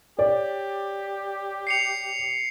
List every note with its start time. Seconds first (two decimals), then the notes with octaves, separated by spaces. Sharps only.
0.19 G4 C#5 D5
1.67 C7 C#7 F7